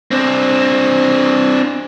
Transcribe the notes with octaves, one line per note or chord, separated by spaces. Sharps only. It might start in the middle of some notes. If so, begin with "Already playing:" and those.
C4 D4